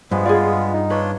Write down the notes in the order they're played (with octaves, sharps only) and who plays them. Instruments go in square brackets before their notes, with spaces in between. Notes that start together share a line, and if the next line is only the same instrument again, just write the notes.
[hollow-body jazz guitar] G2 [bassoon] F3 [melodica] G#3 B3
[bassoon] F4 [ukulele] G#4 D5
[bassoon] D#4
[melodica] D4 F4 C#5 [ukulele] B4